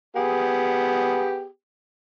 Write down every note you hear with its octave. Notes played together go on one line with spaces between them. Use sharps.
B3 G4 G#4